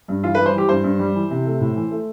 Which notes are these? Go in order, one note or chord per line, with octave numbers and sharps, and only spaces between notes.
G2
E3 F4
B4
G3
C5
E3 G4
G2 C5
G2
G3
E3
C3
A3
A2
E3
A3